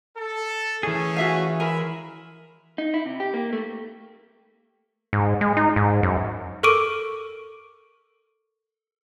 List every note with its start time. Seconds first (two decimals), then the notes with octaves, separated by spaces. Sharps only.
0.16 A4
0.83 E3 A3 C#4 G#4
1.16 F#4 E5 F5
1.60 G#3 A#4 E5 G#5 B5
2.78 D#4
2.94 E4
3.06 C3
3.20 G4
3.34 A#3
3.53 A3
5.13 G#2
5.41 G#3
5.57 D#4
5.76 G#2
6.03 F#2
6.63 A4 A#4 C#6 D6 D7 D#7